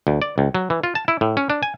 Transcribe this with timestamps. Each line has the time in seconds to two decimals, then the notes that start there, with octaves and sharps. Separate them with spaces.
0.07 D2
0.22 D5
0.38 C#2
0.55 F#3
0.70 E3
0.84 F4
0.95 A5
1.08 E4
1.21 A2
1.37 C#4
1.50 D4
1.63 G#5